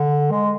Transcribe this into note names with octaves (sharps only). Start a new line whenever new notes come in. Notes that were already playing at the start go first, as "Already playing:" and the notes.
Already playing: D3
G#3